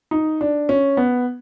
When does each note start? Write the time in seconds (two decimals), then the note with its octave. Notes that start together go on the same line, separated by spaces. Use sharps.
0.11 D#4
0.41 D4
0.69 C#4
0.97 B3